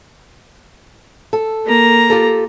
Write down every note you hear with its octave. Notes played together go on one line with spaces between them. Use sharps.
A4
A#3 A#5
F4 G4 A4